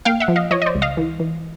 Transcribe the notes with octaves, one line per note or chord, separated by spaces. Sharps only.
A#3 F5 G5
E5 F#5
F3
D#5 F5
F3 C#5 D#5
D#5
C5 D5
C#2
D#5 F5
E3
E3